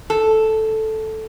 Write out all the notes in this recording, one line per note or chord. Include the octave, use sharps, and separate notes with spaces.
A4